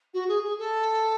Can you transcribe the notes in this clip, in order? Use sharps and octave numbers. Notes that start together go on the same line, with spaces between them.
F#4
G#4
G#4
A4